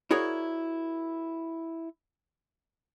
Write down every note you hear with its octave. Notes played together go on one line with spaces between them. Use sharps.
E4 F#4 G#4 A#4 C#5 D5